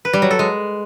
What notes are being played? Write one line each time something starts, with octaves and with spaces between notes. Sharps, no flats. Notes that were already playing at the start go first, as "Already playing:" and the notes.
B4
G3
F#3
A4
G#3